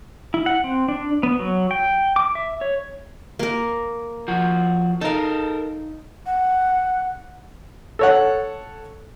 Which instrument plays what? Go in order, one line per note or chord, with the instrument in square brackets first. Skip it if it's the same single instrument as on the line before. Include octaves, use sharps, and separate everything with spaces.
[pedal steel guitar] E4
F#5
C4
D4
B3
F#3
G5
D6
E5
C#5
[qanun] A#3 A#4
[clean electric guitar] F3 F#4
[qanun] D#4 F5 [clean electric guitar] A4 A#4
[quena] F#5
[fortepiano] A4 C#5 F#5